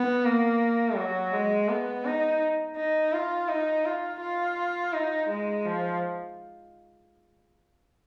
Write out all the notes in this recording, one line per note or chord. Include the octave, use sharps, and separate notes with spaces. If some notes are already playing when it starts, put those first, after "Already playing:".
Already playing: B3
A#3
F#3
G#3
B3
D#4
D#4
F4
D#4
F4
F4
D#4
G#3
F3